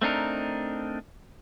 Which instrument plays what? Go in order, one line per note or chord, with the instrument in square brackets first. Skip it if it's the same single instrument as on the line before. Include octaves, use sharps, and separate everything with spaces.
[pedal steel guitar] A3 C4 D4 D#4 A#4